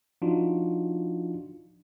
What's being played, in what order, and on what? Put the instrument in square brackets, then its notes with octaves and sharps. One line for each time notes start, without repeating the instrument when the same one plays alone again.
[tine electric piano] F3 D4 D#4 F4 F#4